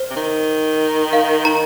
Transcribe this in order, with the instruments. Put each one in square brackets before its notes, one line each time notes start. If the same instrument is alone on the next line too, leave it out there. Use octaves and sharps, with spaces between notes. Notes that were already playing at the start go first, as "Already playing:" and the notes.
Already playing: [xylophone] C5
[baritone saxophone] C3
D#3
[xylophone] F5
[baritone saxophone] D#3 [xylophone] A#5